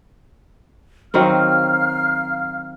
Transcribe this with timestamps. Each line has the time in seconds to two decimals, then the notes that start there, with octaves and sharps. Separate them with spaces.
1.14 D#3 F#3 C4 F5 F6